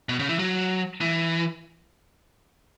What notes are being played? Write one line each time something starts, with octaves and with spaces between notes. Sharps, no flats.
B2
C#3
E3
F#3
E3